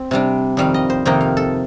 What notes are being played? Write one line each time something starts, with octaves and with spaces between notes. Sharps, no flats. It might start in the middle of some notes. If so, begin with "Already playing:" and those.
Already playing: C4
C3 G3 D4
F2 D#3 G3 F5
D#5
C5
F2 C3 D#3 A#3 D#4 G5
F5
A4